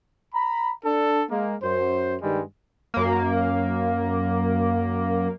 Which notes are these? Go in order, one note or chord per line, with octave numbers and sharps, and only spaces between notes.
A#5 B5
D4 A4
G#3 A#3
F#2 C5
G2 D#3 G3 G#3
F#2 A#3